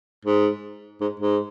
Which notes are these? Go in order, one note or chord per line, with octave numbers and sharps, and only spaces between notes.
G#2
G#2
G#2